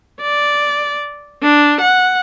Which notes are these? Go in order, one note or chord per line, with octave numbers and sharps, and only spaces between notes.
D5
D4
F#5